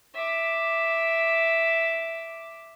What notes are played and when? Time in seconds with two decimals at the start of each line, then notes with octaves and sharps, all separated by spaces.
0.14 E5 D6